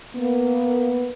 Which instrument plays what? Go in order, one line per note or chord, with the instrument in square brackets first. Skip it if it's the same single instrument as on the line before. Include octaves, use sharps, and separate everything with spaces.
[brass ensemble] A#3 B3